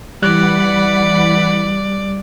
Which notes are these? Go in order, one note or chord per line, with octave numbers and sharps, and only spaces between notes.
E3 G3 D5 F#5 B5 F#6